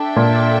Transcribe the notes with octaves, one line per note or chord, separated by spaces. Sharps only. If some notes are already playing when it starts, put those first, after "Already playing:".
Already playing: D4 A4 E5 G5
A#2